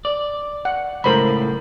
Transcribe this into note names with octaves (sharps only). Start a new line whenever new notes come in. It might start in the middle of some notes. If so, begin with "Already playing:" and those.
D5
F#5
C#2 F#2 A2 A#4 C5 B5